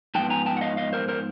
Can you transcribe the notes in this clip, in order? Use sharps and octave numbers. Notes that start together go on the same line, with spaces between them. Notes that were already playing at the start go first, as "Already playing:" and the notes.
G#2 F3 B3 G5 A5
G#5 A#5
G5 A5
F#5
D#5 F5
D#5 F5
A#4 C5
A#4 C5